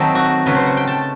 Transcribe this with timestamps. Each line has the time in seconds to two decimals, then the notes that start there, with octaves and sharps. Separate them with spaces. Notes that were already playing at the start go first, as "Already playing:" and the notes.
Already playing: D#3 F#3 A3 C4 D#4
0.15 F#4
0.46 C#3 F#3 A3 B4
0.56 C5
0.66 F#5
0.77 G5
0.87 A5